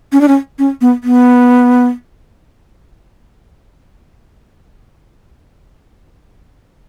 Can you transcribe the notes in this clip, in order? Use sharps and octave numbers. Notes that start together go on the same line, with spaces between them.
C#4
D4
C#4
C#4
B3
B3